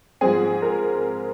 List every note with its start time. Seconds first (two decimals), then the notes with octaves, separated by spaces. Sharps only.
0.21 G#2 F3 G#3 C4 G#4
0.62 A#4